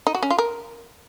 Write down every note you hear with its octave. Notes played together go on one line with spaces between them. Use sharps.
D#4
F#4
C#4
F4
A#4